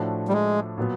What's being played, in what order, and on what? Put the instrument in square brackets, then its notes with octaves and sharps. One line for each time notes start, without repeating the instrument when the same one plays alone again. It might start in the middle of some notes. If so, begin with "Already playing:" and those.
Already playing: [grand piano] A2 F3 A3 D4 F#4
[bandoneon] G3
G#3
[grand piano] A#2 F#3 B3